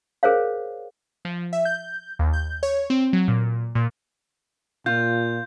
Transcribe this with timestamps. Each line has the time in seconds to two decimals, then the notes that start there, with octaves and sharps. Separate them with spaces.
0.23 G#4 A#4 C5 C#5 F5
1.25 F3
1.53 E5
1.65 G6
2.19 D#2
2.33 G6
2.63 C#5
2.90 C4
3.13 F#3
3.28 A#2
3.75 A#2
4.86 A#2 F4 G6